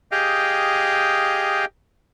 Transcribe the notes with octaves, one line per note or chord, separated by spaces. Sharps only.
G4 G#4 D#5 F5 G5